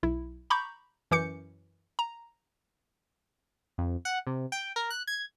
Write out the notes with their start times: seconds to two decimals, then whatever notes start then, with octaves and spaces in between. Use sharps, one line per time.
0.03 B1 E4
0.50 A#5 B5 C#6 D6 G6
1.11 F#2 E3 C#4 D6 G6 C#7
1.99 A#5
3.78 F2
4.05 F#5
4.27 C3
4.52 G5
4.76 A#4
4.90 F#6
5.07 G#6